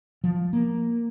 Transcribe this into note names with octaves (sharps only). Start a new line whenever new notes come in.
F3
A#3